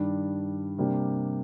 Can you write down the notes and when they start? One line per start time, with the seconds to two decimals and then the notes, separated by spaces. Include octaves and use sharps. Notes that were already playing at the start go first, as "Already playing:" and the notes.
Already playing: G2 D#3 G3 D4
0.78 C3 G3 A#3 D4 G4